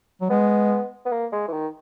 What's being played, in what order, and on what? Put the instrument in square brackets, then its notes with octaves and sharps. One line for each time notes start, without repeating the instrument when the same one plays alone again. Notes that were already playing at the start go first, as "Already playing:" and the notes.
[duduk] F#3
[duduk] G#3 [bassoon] B3
[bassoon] B3
A#3
G#3
E3
D#3